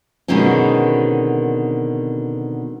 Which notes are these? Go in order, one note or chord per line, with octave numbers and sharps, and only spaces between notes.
B2 D3 D#3 G#3 C4 C#4